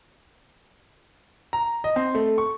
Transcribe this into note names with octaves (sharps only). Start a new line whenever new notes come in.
A#5
D#5
C4
A3
C#6